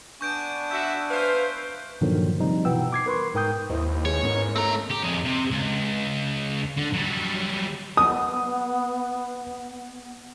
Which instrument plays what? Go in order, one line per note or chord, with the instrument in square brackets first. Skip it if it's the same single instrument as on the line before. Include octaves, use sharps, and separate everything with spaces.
[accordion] B3 D4 G#5 [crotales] C#6 G6 D7
[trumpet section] F#4 E5 [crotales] G6
[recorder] B4 [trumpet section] C5 E5 F5
[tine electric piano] G2 A#2 D3 D#3 F3 F#3
C3 F3 G3 D#4
B2 E3 B3 G5 E6
D6 G#6 C7
A#4 B4 C6 C#6
G#2 A#4 G5 D#6 G6
[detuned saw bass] D#2 [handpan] E4 C5 D#5
[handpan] G#3 G#4 B4 [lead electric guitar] C#5
[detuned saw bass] G#2 [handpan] B3 C#4 A#4
[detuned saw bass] A3 [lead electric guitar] C4 A#5
[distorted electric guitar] G4
F2 G#4
C3
C#2
D3
F#3 G3
[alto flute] B3 [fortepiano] D#6